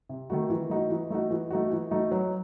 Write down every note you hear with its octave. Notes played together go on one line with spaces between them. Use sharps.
C3
D#3 A3 D#4 F#4
E3
A3 D#4 F#4
E3
A3 D#4 F#4
E3
A3 D#4 F#4
E3
A3 D#4 F#4
F#3